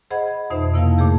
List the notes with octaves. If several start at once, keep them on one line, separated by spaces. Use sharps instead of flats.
G#4 C5 D#5 F#5 B5 G#6
F2 B2 D#4 C5 E5
C3 A#3 E4 A#4 F5 A5
A#2 A3 G#4 G6